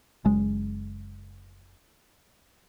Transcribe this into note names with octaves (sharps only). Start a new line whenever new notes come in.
F#1 G#3